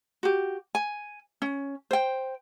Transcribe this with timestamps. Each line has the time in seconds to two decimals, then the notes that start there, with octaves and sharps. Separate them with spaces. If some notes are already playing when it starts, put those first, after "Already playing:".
0.23 F#4 G4
0.75 G#5
1.42 C#4
1.91 C5 G5